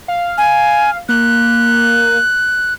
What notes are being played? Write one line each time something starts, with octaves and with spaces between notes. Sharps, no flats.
F5
G#5
A#3 F#6